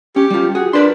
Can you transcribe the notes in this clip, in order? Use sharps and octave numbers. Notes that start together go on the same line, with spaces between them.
C#4 G4
G3 F4
F#4 G#4
D4 A#4 B4 C6